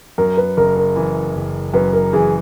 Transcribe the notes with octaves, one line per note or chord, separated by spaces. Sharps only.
F#2 A#4
B4
F#1 A#4
A#4
E3
F#1
F#2 B4
A#4
E3 G#4